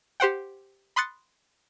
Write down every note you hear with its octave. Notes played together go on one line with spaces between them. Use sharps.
G4 C5 F#5 G5
B5 C6 D#6 F#6 A6 C#7